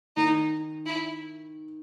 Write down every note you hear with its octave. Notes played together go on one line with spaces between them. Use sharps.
D#3 D#4
E4